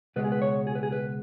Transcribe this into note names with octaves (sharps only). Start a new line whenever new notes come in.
C#2 B2 G#3 B4
G#4
B4
C#5
G#4
B4
G#4
B4